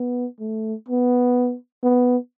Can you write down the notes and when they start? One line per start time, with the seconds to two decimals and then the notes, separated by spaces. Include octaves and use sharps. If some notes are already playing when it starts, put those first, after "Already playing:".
Already playing: B3
0.41 A3
0.89 B3
1.84 B3